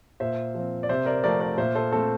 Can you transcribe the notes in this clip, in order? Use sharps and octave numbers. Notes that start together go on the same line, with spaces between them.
A#2 C5 E5
F3
C4
D5
C3 C5 E5
A#4 D5
F3 A3 C4 A#4 D5
A#4 D5
A#2 C5 E5
A4 C5
A3 C4 A4 C5